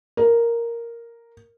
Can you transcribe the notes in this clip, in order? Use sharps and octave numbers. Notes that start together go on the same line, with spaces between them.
A#4